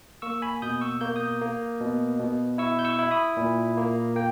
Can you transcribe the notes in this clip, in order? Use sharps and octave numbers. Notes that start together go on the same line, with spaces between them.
A#3 C#6 E6
G#5 B5
B2 D#6 G6
C#6 E6
A#3 G6
D#6 G6
A#3
B2
B2
E4 C#6 E6
G6
C#6 E6
E4
B5 D#6
A#2
A#3
A#3 G5